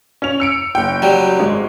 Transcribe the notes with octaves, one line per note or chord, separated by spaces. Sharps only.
C#4 F7
E6 C#7 D7
F#1 G5
F#3 G3
G#1 G#3